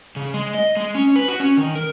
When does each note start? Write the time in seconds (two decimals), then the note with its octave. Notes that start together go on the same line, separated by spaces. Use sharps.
0.16 C#3
0.34 G#3
0.54 D#5
0.77 G#3
0.95 C#4
1.16 B4
1.28 F#4
1.40 C#4
1.57 D#3
1.75 A#4